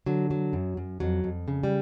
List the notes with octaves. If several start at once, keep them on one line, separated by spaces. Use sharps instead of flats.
D3 F#3
F#3
F#2
F#2
F2 F#3
F2
C#3
G3